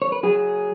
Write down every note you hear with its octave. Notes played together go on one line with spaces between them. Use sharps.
C#5
B4
F#3 G#4